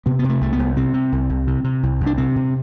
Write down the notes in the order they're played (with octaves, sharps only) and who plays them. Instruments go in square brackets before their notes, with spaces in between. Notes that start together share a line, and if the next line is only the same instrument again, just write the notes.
[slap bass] C3 B3
B3
C3
A3
C2 A3
B3
C2
C3 C4
C3
C2
C2
C3
C3
C2
C2
D4
C3 C4
C3